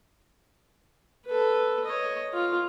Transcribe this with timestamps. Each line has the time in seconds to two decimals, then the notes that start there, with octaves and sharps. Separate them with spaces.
1.26 A4 B4
1.85 C#5 D#5
2.34 F4